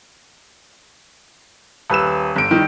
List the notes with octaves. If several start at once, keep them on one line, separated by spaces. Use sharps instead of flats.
D#1 B4 E6 E7
G1 D7
D#3 G3